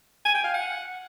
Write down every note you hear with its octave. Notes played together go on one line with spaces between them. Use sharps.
G#5
G5
F5
F#5